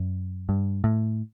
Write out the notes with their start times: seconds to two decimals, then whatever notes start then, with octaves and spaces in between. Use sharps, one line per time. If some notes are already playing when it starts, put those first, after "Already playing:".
Already playing: F#2
0.49 G2
0.84 A2